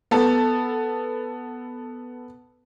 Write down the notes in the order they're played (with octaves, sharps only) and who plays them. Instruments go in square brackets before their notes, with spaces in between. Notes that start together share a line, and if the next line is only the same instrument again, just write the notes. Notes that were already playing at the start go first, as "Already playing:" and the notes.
[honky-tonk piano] B3 A4